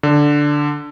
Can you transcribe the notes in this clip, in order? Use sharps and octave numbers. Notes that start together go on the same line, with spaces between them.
D3